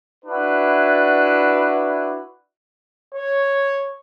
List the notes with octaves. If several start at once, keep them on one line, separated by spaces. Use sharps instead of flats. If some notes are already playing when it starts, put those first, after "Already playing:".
D4 E4 F#4 B4
C#5